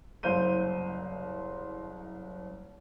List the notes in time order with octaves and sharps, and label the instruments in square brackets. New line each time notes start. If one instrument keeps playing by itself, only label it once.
[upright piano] F#1 C2 C5 F5 G6 D#7